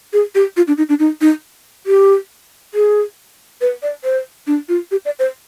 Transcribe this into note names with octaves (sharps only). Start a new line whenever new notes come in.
G#4
G4
F4
D4
D#4
D4
D#4
D#4
G4
G#4
B4
D5
C5
D4
F4
G4
D5
C5